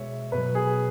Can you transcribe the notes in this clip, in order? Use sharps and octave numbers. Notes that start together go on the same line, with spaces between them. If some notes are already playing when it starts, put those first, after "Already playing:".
Already playing: B2 G#3 C#5 E5
B2 F#3 B4
G#4